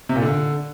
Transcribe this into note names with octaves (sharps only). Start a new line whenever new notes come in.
C3
A#2
D3